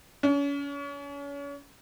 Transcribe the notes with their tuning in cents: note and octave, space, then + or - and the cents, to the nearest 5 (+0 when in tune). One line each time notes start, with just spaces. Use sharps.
C#4 +35